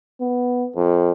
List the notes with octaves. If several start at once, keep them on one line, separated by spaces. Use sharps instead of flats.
B3
F2